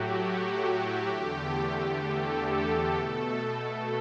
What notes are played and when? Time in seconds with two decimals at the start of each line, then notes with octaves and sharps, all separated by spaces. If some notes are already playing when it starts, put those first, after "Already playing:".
Already playing: A2 F#3 A3 F#4 G4
0.17 G4
1.11 E2 D3 A3
2.02 A4
2.95 B2 A3